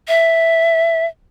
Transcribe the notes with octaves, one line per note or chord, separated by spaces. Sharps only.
E5